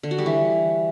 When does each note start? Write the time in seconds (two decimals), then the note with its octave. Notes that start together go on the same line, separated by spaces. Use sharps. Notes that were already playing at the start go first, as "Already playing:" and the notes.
0.03 D3
0.11 F#4
0.18 G3
0.26 E3